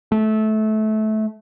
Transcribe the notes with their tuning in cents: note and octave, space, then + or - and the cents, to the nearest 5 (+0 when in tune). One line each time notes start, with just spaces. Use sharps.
A3 -20